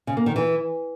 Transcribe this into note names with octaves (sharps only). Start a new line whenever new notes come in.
C#3
A#3
D#3
E3